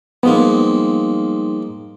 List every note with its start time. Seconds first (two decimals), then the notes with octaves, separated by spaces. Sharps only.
0.23 F3 G3 G#3 A#3 B3 D#4 C6